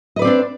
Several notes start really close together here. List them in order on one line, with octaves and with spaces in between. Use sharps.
D#5 B4 D5 C4 D4